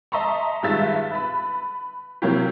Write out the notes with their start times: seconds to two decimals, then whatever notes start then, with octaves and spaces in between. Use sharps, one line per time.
0.12 D#5 E5 A5 A#5 C6 C#6
0.63 G2 D#3 G#3 F4 E5 A6
1.10 B4 B5
2.22 C3 F#3 A#3 E4 G4